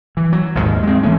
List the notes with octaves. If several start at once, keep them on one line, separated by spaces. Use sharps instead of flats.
E3
F#3
A1 D#2 G#2
G#3 C4
E3 A3 C#4